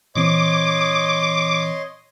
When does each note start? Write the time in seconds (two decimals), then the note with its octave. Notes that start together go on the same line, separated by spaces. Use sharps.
0.16 A#2 E3 C4 C#5 D#5 C6 D6